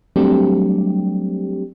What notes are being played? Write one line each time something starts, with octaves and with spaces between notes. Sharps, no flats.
F#3 G3 A3 C4 D4 G4